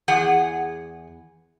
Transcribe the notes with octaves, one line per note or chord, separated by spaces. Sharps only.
E2 G#4 F#5